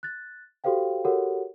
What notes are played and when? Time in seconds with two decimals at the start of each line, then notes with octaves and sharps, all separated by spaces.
0.03 F#6 A6
0.64 F#4 G4 A4 C5 F5 G5
1.05 F#4 G4 A4 A#4 C#5 F#5